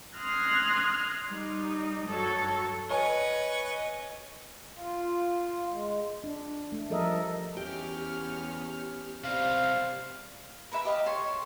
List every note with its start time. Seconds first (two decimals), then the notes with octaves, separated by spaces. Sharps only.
0.17 C6 D#6 F6 F#6 G#6 A#6
1.28 G3 D#4
2.07 G2 F#3 A4 C#6
2.90 B4 C#5 D#5 G#5 C#6
4.75 F4
5.71 G#3
6.24 D4
6.72 A3
6.90 F3 G3 A4 A#4 D#5 E5
7.57 E2 C#4 G4 F6
9.24 C3 G3 C5 F5
10.71 A#4 B4 E5 B5
10.85 G4 D#5 F5
11.06 A4 C#5 C6 C#6